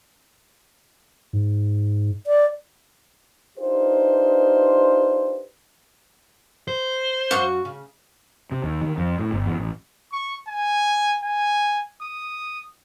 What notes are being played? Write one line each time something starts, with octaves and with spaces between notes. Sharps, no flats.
G#2
D5
D4 D#4 F4 G4 B4 C5
C5
F#2 F#4 F5 C#6
C#3
C3
D#2
D#3
F2
A2
G1
E2
A1
C#6
G#5
G#5
D#6